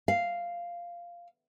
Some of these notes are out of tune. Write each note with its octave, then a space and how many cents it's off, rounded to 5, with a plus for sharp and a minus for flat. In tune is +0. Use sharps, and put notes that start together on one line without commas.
F5 -5